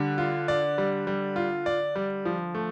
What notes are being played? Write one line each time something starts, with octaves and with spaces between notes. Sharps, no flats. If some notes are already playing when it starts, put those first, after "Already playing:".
Already playing: D3 G3
F4
D5
G3
G3
F4
D5
G3
F3
A3